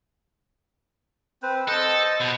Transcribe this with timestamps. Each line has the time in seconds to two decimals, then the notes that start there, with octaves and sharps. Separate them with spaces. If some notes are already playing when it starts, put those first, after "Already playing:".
1.42 C4 B4 C5
1.68 A4 C5 D#5
2.20 B2